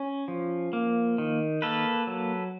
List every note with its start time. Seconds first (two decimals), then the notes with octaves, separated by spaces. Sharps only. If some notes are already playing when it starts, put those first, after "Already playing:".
Already playing: C#4
0.28 F3
0.73 A#3
1.18 D#3
1.62 A#3 A4 B4
2.07 F#3